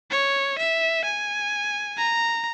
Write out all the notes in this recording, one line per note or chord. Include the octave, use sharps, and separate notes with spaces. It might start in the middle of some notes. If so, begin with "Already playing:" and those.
C#5
E5
G#5
A#5